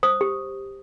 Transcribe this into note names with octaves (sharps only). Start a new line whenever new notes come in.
C5 D#6
G4